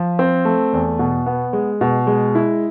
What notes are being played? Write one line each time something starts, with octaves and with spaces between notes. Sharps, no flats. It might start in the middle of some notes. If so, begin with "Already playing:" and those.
Already playing: F3
C4
A3
E2
B2
B3
G#3
B2
G#3
E4